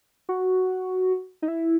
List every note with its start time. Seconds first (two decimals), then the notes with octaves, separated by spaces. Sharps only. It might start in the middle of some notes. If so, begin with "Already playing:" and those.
0.29 F#4
1.42 D#4
1.48 E4